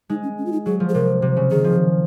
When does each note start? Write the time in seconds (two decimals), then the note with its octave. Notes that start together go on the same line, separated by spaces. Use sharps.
0.10 G#3 D#4
0.23 C#4
0.38 C#4
0.46 F4
0.52 D#4
0.66 F#3 G#4
0.80 F3
0.89 G#4
0.94 C3 A#4
1.22 C3
1.37 C#3
1.51 D#3 G#4
1.64 F3